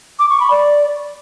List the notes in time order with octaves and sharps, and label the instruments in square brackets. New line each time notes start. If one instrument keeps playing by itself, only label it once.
[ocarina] D6
C#6
B5
D5